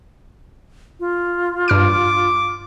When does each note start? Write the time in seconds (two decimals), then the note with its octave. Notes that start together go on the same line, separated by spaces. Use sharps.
1.00 F4
1.68 G2 D6 F6 D7